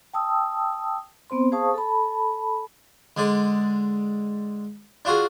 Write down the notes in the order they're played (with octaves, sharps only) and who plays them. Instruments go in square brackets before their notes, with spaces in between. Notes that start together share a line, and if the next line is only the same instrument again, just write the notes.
[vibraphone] G5 A5 D#6 E6
B3 C4 C5 C6
G#4 C5 F5 A5 C#6 D#6
A4 A5 B5
[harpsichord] D3 G#3 D5
D4 F4 F#4 G#4